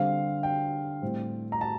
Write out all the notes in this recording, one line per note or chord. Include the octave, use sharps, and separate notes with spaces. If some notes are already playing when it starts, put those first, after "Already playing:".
Already playing: D3 G3 C4 F5
G5
A2 G3 C4
A#5
A5